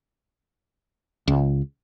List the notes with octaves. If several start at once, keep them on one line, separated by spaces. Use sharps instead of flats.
C#2